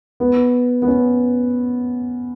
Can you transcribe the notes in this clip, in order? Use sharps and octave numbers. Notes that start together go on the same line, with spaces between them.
B3
B3
C#4